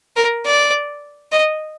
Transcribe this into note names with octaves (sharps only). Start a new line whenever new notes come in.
A#4
D5
D#5